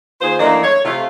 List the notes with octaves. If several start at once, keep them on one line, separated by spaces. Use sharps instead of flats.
D#2 F4 G#4 C5
F#2 E3 A3 A#3 D4 D#5
C#5
C3 A3 F4